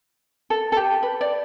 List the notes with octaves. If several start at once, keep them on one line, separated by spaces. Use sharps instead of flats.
A4
A4
G4
B4
D5